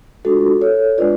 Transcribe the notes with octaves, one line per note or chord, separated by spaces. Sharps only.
G#3 D4 F4 F#4 A4
A4 C#5
G#3 D4 F4 B4 D5